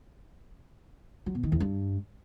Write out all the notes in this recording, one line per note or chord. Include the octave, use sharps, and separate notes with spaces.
F#3
B2
D#3
E2
G2